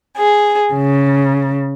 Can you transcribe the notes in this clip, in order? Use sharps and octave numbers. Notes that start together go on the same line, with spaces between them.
G#4
C#3